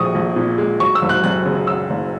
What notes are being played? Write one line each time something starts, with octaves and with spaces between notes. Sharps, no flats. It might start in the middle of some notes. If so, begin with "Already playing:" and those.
Already playing: A#1 A#2 G#3 C#6 D#6
A#1
A#2
G#3
F#3 C#6
E6
F#1
F#6
F#2 F#6
C#3
F#3 E6
F#1